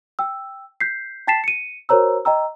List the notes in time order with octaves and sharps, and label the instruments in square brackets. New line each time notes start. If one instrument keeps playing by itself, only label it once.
[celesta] G5 E6
G6 B6 C7
G5 A5 A6 B6 C7 E7
C#7 D#7
F#4 A#4 C5 C#5 A#5 E6
D#5 G5 A#5 E6